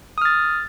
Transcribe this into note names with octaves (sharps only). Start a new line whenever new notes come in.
D#6 F6 A6